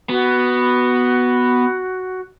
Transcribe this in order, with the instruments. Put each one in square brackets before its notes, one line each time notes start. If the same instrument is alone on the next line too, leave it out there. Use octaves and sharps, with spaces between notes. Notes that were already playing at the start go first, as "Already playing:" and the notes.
[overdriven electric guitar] B3 [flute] F#4